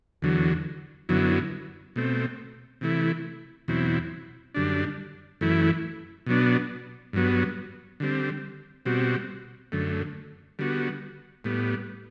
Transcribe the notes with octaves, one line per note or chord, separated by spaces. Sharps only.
E2 D3 F#3
F#2 D3 F#3 B3 E4
B2 A3 C4
C3 E3 A3 E4
E2 B2 F#3 C4 E4
F#2 D3 G3 D4
F#2 E3 A3 E4
B2 F#3 B3 D4
G2 F#3 B3
D3 G3 C4
B2 G3 C4 F#4
F#2 D3 A3
D3 G3 B3 F#4
A2 G3 B3